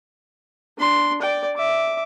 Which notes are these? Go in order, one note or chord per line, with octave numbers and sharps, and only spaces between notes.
D4 C6
D5 G5
E5 D6